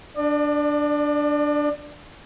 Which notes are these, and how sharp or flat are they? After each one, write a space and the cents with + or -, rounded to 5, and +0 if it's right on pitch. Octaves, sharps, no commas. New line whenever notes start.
D4 +0 D5 +35